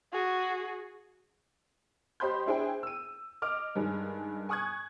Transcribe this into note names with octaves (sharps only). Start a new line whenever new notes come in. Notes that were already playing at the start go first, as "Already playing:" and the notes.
F#4 G#4
G4 C5 D#5 B5 C6 G6
D4 E4 G#4 C5 G5
E6 D#7
D#5 D6 F6
G2 D#3 G#3
G#5 C#6 D#6 F#6 G#6